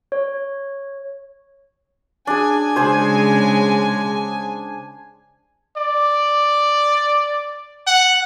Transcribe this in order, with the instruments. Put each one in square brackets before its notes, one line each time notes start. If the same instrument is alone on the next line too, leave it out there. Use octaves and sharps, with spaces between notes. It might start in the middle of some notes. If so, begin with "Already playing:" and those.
[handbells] C#5
[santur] D4 G#4 [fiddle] G#5
[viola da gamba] C#3 G#3 [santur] G#4 C5
[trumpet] D5
F#5